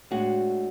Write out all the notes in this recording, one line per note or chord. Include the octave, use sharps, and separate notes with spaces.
A2 G#3 D4 F#4